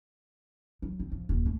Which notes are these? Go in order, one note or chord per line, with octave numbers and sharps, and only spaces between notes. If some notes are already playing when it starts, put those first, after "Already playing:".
F#3
C4
F3
D#1
A3